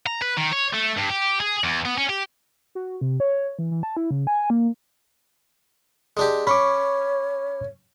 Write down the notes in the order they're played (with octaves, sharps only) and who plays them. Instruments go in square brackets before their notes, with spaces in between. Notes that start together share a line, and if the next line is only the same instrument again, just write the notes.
[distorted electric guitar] A#5
B4
D#3
C#5
A3
G2
G4
G#4
E2
B3
C#4
G4
[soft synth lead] F#4
C3
C#5
E3
E3
A5
E4
C#3
G#5
A#3
[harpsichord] G#3 D4 G4
[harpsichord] C#4 [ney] C#5 [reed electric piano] B5 C#6 D6